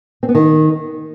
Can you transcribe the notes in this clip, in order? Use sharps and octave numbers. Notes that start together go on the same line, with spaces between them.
C4
B3
D#3